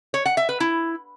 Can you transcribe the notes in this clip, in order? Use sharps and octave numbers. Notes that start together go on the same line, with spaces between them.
C#5
F#5
E5
B4
E4